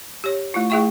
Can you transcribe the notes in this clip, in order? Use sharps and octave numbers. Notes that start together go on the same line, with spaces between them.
G4 C#5
A3 E4 F4
A3 E4 G#4 E5 G5 C#6